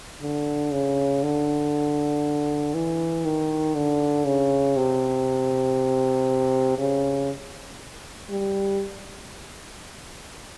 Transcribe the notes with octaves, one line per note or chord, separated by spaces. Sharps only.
D3
C#3
D3
E3
D#3
D3
C#3
C3
C#3
G3